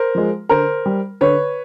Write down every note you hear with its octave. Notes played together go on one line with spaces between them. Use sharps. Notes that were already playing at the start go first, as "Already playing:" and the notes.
Already playing: A#4 C5
F3 G#3
D3 A#4 C5
G3
D3 B4 C#5